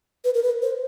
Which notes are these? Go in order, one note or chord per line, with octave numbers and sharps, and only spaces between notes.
B4
A#4
B4
C5